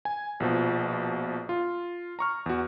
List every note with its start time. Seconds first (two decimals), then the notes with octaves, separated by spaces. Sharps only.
0.05 G#5
0.40 A#1 B2 F3
1.49 F4
2.19 A#5 C#6 F6
2.46 E2 F#4